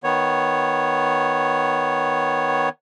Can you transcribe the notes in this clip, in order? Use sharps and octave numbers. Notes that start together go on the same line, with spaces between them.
D#3 B3 C#5